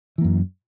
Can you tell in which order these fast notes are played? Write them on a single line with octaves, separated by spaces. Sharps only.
E3 A#3 F#2